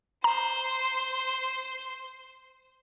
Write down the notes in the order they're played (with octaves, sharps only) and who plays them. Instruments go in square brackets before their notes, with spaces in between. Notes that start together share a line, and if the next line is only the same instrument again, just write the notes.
[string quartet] C5 C6 [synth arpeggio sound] A#5